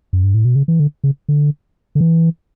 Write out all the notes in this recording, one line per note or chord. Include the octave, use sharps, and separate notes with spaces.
F#2
G2
A2
B2
C#3
E3
D3
C#3
D3
D3
E3